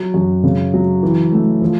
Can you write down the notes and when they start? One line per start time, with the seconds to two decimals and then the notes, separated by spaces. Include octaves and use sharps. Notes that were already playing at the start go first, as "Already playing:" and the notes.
Already playing: F#3
0.14 F#2
0.43 C#3
0.74 F#3
1.03 E3
1.32 A3
1.62 F3